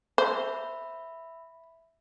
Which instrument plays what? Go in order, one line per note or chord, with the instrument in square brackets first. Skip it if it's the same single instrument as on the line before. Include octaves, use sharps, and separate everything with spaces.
[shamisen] C5 [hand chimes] E5 B5